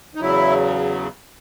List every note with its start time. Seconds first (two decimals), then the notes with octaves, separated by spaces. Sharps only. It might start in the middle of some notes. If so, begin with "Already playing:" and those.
0.15 D#4
0.21 E2 C#3 F#3 E4